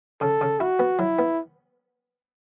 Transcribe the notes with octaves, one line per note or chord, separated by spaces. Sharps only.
C#3 A4
C#3
E4 F#4
B3
F#3 E4
B3